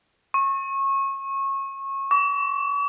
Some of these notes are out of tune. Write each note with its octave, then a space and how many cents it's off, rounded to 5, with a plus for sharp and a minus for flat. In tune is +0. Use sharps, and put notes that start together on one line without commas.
C#6 -25
C#6 +45